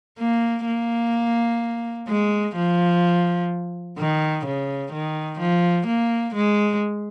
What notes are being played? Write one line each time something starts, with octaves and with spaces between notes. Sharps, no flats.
A#3
A#3
G#3
F3
D#3
C#3
D#3
F3
A#3
G#3